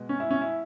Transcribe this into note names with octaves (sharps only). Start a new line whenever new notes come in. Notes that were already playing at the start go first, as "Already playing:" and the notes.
Already playing: B2 G#3 B3
C#4
E4
C#4
E4